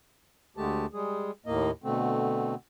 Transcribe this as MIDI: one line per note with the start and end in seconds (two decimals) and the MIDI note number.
0.57 0.86 38
0.57 0.86 50
0.57 0.86 56
0.57 0.86 57
0.57 0.86 67
0.57 0.86 81
0.93 1.31 55
0.93 1.31 56
0.93 1.31 68
1.46 1.71 39
1.46 1.71 45
1.46 1.71 58
1.46 1.71 75
1.84 2.55 47
1.84 2.55 50
1.84 2.55 57
1.84 2.55 60